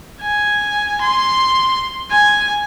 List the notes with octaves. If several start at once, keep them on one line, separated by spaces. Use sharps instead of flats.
G#5
C6
G#5